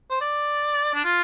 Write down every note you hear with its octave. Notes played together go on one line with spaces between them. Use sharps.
C5
D5
D4
F4